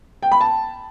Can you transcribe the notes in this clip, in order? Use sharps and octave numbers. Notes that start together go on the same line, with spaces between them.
G5
B5
A5